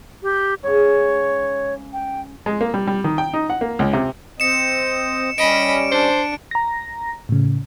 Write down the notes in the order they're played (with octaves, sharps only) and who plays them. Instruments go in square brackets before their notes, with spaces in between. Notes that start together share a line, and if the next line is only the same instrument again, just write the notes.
[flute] G4
[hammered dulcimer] G#2 C#3 [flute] C#5
[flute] G5
[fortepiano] G#3
A#3
G3
G3
D#3
G5
D#4
F#5
A#3
C#2
C3
[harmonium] C4 D#5 [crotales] C#7 E7
[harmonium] G3 C#4 [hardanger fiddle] D#5 B5 [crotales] D7
[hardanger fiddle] D4 [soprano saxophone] C5
[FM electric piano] A#5 A#6
A2 C#3